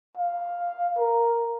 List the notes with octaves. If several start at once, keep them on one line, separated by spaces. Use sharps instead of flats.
F5
A#4